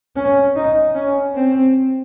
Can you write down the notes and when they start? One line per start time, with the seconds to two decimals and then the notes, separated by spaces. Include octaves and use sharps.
0.16 C#4
0.56 D#4
0.95 C#4
1.35 C4